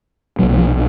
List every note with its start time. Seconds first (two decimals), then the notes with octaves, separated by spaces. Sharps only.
0.39 B1 A#2 F#3
0.53 F#3
0.58 F3